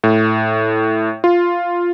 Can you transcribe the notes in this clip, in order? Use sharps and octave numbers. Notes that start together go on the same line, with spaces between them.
A2
F4